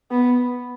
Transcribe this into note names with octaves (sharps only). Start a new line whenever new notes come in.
B3